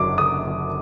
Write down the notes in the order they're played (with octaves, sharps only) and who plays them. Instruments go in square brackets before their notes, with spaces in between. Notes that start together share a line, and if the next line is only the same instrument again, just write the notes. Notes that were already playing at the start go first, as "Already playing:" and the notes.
Already playing: [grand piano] F#1 F#2 D3 F#3 [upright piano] D6
[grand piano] F#1 [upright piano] D#6
[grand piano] F#2 D3 F#3